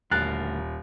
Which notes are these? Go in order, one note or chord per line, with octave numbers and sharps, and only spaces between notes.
D#1 D2 A#4 F#6 A6 C7